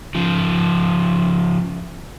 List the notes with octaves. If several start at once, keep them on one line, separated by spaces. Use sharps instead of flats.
C#3 F3